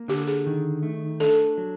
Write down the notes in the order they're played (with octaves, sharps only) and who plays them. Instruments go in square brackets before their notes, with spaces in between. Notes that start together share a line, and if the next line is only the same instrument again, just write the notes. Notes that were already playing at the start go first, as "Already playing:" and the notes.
Already playing: [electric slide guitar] A#3
[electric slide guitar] D3 [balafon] G4
[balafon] G#4
[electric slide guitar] D#3
A3
[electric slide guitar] D4 [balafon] A4
[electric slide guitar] F#3